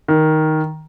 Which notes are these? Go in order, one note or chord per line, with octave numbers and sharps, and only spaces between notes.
D#3